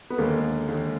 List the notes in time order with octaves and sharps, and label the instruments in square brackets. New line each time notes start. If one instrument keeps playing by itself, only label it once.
[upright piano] B3
[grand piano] D#2 D3 G#3 [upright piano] A#3
[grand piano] D#2 D3 G#3